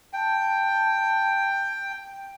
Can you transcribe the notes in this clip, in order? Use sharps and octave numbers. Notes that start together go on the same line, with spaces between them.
G5 A5